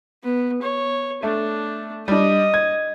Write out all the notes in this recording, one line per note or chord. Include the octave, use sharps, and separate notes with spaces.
B3
C#5
A3 D4
G3 D4 D#5
G#6